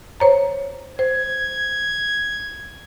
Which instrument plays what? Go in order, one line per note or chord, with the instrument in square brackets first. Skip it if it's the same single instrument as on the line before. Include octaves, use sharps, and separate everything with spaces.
[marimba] C5 C#5 A#5
[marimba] C5 [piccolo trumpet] G#6